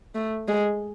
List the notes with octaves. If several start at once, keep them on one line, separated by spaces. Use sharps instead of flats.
A3
G#3